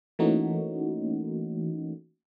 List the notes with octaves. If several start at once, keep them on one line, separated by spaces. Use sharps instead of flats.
E3 A3 A#3 C#4 D#4 F#4